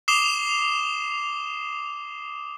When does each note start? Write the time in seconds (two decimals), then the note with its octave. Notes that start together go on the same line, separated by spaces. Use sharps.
0.08 D6 D#6 C7 E7 F7 G7